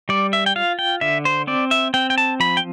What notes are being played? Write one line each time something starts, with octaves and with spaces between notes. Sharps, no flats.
G3 D5
E5
G5
F4 F5
G5
D3 E5
C5
C4 D5
E5
C4 G5
G5
A5
F3 B5
G5